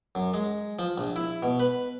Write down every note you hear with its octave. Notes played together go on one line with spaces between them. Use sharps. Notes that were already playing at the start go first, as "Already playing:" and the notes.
F#2
G#3
F3
A#1
E4
B2
B4